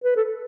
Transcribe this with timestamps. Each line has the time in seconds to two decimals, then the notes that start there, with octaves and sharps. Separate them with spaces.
0.04 B4
0.16 A4